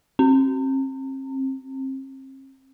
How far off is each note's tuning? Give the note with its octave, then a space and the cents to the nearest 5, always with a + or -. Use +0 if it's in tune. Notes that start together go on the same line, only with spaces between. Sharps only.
C4 +40